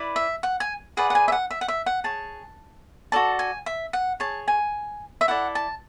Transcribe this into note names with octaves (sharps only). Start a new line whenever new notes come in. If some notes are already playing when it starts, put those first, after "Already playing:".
Already playing: E4 B4 D5
E5
F#5
G#5
G#4 B4 D5 F#5
F#5
G#5
E5
F#5
E5
F#5
E5
F#5
G#4 C#5 A5
F#4 A4 D5 A5
G#5
E5
F#5
G#4 C#5 A5
G#5
E5
E4 A4 D5 F#5
A5